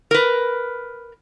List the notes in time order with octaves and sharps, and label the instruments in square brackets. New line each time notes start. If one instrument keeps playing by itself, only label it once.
[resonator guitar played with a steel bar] A#4 B4